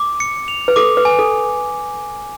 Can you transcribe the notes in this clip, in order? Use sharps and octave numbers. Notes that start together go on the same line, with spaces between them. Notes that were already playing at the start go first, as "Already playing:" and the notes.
Already playing: D6
C#7
F7
B4
A4 D6
B4
G#5
A4